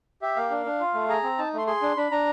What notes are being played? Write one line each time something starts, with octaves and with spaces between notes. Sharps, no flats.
G4 E5
A#3 F5
D4
D4
F4
A3
G#4 A#5
C4
D#4 A5
A3 C6
G#4 C6
D4
D4 B5
D4 A#5